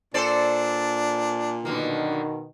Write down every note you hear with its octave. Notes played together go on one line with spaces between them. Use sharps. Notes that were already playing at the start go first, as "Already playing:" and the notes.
A#2 D4 A4 C5 D5
F#2 B2 D3 D#3 A#3